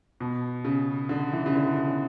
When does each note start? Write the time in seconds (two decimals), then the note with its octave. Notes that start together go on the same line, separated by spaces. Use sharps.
0.20 B2
0.65 C#3
1.09 D3
1.33 E3
1.46 C#3
1.55 D3
1.77 C#3